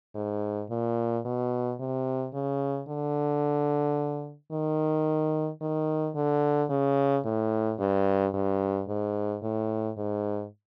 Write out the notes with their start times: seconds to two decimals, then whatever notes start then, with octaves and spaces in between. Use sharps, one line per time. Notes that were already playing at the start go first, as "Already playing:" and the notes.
0.15 G#2
0.70 A#2
1.25 B2
1.79 C3
2.33 C#3
2.88 D3
4.52 D#3
5.61 D#3
6.15 D3
6.70 C#3
7.25 A2
7.79 G2
8.34 G2
8.88 G#2
9.42 A2
9.97 G#2